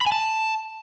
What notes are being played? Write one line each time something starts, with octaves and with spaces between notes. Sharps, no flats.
B5
G#5
A5